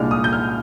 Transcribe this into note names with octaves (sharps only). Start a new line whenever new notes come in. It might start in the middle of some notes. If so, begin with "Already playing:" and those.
Already playing: C2 A#2 G#3 D4 F6
D#6
G6
F6